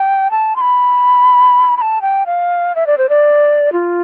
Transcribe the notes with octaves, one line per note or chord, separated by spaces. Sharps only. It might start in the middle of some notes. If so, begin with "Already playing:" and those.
Already playing: G5
A5
C6
B5
B5
A5
G5
F5
E5
D5
C5
D5
F4